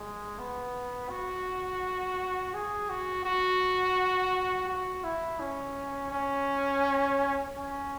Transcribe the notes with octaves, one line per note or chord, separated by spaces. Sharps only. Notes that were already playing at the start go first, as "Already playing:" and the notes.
Already playing: G#3
B3
F#4
G#4
F#4
F#4
F#4
E4
C#4
C#4
C#4